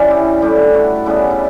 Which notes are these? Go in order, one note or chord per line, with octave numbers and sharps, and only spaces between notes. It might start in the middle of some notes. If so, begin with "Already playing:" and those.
Already playing: E3 G3 C#4 D4
E4 G4
A2 G3 D4 E4 G4
F#4 A4
C#3 G3 B3 D4 E4 G4
E4